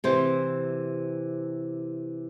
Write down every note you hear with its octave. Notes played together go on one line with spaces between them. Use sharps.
C3 E3 C5